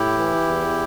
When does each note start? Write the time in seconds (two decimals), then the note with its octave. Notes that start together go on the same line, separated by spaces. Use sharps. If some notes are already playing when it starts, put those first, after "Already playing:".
Already playing: A2 E4 G4
0.18 E3
0.48 E2